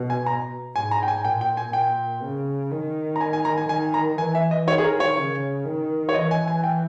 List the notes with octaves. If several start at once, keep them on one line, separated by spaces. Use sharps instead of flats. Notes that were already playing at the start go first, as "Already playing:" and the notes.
Already playing: B2
G#5
A#5
G#2 G#5
A#5
G5
G#5
A#2 G5
G5
G#5
A#2 G5
C#3
D#3
A#5
G#5
G#5
A#5
G#5
D#3 G#5
A#5
E3 G#5
E5
D#5
D#3 C#5
G#4
A#4
C#5
C#3
D#3
C#5
E3 D#5
G#5
G#5
G5